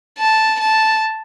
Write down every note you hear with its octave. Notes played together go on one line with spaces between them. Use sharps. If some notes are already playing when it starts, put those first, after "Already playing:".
A5
A5